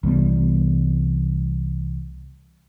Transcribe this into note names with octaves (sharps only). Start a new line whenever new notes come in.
C2 E3 G3 B3